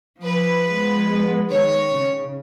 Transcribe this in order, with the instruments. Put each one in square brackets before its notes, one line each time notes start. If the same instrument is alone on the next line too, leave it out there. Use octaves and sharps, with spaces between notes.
[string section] F3 B4
[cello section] G#3 B3
[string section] D#3 C#5
[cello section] C#3